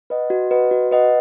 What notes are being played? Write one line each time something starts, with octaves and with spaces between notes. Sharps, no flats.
B4 D#5 F#5
F#4
B4 D#5 F#5
F#4
B4 D#5 F#5